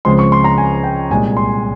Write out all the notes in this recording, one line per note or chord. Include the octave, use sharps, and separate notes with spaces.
C#2 C#3 F3 G#3 C4 C6
C#6
C6
A#5
G#5
G5
C2 A#2 G#3 G#5
C6